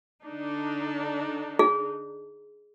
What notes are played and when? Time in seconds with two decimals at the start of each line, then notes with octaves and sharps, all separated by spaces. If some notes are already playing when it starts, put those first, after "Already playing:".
0.25 D3 D4 D#4
1.59 G#4